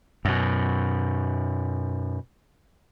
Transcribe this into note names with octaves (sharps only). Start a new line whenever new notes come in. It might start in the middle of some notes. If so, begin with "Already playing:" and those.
F#2 B2